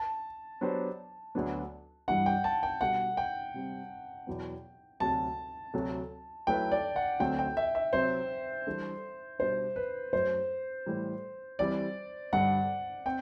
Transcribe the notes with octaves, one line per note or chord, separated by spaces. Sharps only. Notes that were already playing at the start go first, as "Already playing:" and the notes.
Already playing: A5
F#3 B3 D4 G4 C5
D2 D3 F#3 B3 D4
G2 E3 G3 D4 F#5
G5
A5
G5
B2 G3 D4 A4 F#5
G5
C3 G3 C4
E2 B2 F#3 B3
D2 C3 F#3 A5
D2 C3 F#3 A3
F#3 A3 E4 B4 G5
D5
F#5
D2 D3 F#3 A3 C4 G5
G5
E5
E5
C3 F#3 C4 C5
E3 G3 D4 A4
B2 G3 D4 C5
B4
F#2 F#3 A3 C5
A2 E3 G3
E3 G3 C4 G4 D5
G2 D3 G3 F#5
C4 G5